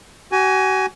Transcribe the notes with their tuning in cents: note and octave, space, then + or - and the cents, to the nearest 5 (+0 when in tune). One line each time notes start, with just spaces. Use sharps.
F#4 +40 G#5 +0